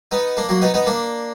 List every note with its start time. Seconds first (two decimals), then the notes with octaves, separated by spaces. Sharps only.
0.11 B3 D#4
0.37 A#3 D4
0.49 F#3 A#3
0.61 B3 D#4
0.74 B3 D#4
0.86 A#3 D4